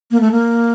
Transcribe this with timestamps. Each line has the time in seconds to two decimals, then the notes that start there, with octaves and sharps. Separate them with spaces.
0.11 A#3
0.20 A3
0.32 A#3